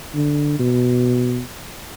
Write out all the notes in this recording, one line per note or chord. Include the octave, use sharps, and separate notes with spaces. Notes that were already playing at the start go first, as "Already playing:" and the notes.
D3
B2